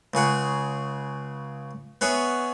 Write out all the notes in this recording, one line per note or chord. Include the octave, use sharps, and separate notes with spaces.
C#2 C#3 G#4 F#5
B3 F#4 G#4 C#5 E5